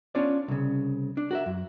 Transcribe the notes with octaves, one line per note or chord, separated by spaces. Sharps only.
B3 C#4 D4 F4 C#5 D5
C2 C#3
D4
F#4 A#4 E5
F#2